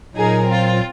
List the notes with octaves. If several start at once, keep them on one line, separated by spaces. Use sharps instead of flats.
A#2 F#3 D#4 G#4 A#4
C4 F4